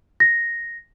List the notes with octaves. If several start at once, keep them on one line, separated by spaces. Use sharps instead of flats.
A#6